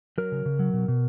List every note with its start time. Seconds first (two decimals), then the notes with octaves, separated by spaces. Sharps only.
0.18 F#3 A#4
0.32 C#3
0.45 C#3
0.59 F#3
0.73 B2
0.88 B2